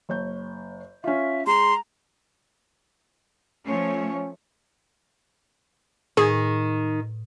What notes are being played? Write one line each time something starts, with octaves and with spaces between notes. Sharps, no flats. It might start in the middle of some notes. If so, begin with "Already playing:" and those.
F#1 C#5 G6
C#4 F4 E5
G#3 A#5 C6
F3 A3 C#4 C#5
A2 D#3 G#4